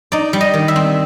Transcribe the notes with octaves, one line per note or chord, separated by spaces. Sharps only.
D#4 D5
G3
D#5
D#3
E5
C4